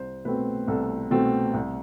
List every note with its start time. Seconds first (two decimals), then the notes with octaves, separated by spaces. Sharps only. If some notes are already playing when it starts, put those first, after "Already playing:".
Already playing: C2 C5
0.25 B2 A3 C4 B4
0.68 C2 A4
1.11 B2 A3 C4
1.54 C2